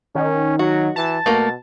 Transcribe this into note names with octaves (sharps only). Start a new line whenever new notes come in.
D#3 C#4
F#3 F#4
E3 A5
B2 A3 A#3 A#4